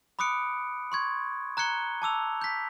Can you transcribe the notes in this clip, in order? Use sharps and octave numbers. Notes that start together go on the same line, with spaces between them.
B5 D6 D#6 F#6 C#7 D7
C6 C#6 G#6
A#5 F#6 G#6 C#7 G7
A5 D6 E6 F7
G6 B6